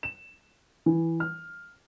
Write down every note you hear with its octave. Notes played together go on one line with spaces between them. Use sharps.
E7
E3
F6